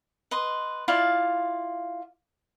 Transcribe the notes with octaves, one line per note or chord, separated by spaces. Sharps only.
B4 D#5 C6
E4 F4 D5 F5